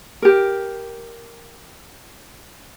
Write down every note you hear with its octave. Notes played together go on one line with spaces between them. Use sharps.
G4 A#4